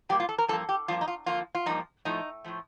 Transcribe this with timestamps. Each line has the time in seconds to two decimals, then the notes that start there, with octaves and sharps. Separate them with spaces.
0.09 A#2 G3 A#3 G4
0.20 F4
0.29 A4
0.38 A#4
0.48 G2 F3 A#3 A4
0.69 G4
0.88 G2 F3 A#3 F4
1.01 D#4
1.08 F4
1.26 F2 D3 F3 A#3 F4
1.55 F4
1.66 G2 F3 A#3 D#4
2.05 A2 F3 A3 D#4
2.44 A2 F3 A3